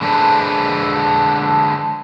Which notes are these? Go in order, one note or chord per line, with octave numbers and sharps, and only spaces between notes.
D3 G#3 D4 A4 B4 C5